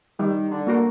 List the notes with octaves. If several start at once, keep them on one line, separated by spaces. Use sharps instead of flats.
D#3 G3
D3
A#3 F#4 A#4